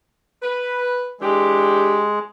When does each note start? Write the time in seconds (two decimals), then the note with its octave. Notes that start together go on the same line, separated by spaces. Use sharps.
0.43 B4
1.21 E3 G#3 D4 G4